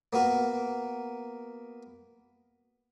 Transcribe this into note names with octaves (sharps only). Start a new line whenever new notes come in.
A#3 B3 F#4 A#4